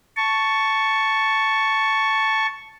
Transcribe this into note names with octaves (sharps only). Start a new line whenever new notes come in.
A5 C#6